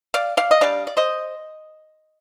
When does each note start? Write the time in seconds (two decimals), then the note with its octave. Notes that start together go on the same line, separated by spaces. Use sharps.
0.14 D5 F5
0.37 D5 F5
0.51 D#5
0.61 G3 D4 D5 F5
0.87 D5
0.97 C5 D#5